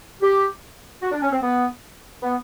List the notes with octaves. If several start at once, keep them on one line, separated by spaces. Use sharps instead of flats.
G4
F#4
D4
C#4
C4
B3
B3